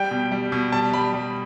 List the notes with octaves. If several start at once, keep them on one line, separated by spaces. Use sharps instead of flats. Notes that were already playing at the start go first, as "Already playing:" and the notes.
Already playing: G3 G5
B2
G3
B2
G3 A5
G3 B5
G3